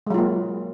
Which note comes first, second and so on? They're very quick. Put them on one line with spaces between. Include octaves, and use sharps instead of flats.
G#3 F#3 F4 A#3